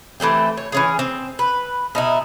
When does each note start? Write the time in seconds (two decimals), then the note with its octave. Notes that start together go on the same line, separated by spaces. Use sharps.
0.20 E3 A3 C4 G4
0.57 C#5
0.72 E3 C#4 G#4
0.99 C4
1.39 B4
1.95 B2 D#4 E4